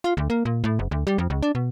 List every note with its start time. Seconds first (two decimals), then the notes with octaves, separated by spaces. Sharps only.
0.04 F4
0.17 D2
0.30 A#3
0.45 A#2
0.64 A2
0.79 F#1
0.91 D2
1.07 G3
1.18 F2
1.30 C#2
1.43 D4
1.55 B2